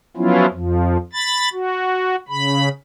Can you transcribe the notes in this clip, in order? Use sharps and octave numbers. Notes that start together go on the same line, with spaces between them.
F3 F#3 B3 C#4 E4 F4
F2 F3
B5 A6
F#4
C#3 B5